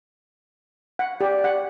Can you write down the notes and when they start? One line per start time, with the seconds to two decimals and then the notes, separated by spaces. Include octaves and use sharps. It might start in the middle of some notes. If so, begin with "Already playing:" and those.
0.99 F#5
1.21 G4 D5
1.44 F#5